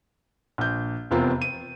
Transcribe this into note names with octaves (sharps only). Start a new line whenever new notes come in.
A#1 G6
F1 E2 C3 C4 F4 A#4
D#7